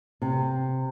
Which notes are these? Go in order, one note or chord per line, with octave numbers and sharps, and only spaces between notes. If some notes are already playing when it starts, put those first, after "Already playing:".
C3